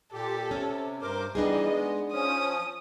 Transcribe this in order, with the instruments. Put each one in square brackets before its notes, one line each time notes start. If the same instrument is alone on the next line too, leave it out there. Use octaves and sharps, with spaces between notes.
[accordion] A#2 G4 [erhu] A4
[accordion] C3 [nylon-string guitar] C#4
[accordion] G2 A#4 D6 [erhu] C5
[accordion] E3 G3 B3 [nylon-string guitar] D4 D#4 G#4 [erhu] D#5
[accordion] G#3 B3
[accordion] F3 C#4 [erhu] D#6